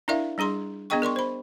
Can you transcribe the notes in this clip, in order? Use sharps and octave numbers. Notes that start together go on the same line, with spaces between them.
D4 E4 A#4 D5 E5 F5
G3 D4 G#4 A#5 C6
B3 D4 G#4 D#5 G5 C#6
A#4 D5 C6 C#6
C5 B5